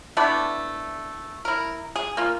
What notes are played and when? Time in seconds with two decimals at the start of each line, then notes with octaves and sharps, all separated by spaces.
0.17 A3 B3 D4 E4
1.45 E4 A#4
1.96 G#4
2.17 A#3 F4